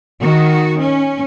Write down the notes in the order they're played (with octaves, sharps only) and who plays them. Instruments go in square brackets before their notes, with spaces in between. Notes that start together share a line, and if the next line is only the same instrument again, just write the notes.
[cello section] D#3 F#4
C#4